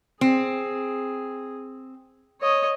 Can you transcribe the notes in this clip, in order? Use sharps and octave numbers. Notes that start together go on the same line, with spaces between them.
C4 G#4
C#5 D#5